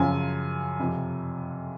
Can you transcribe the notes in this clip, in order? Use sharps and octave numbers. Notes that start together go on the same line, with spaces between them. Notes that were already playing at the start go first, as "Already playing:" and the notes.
Already playing: F#2 C#3 F3 G#5
F2 C3 F3